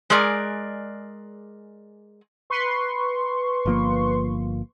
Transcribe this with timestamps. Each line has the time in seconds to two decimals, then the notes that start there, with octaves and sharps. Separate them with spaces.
0.10 G#3 G#4 A#4 D5
2.50 B4 C6 C#6
3.66 G1 F3 A#3